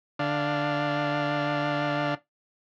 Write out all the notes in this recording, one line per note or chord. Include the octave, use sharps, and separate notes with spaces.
D3 D4 F5